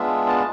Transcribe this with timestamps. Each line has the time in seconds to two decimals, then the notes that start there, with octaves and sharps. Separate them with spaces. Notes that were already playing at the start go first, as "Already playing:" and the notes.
Already playing: G#3 B3 D4 F4 E5
0.27 A5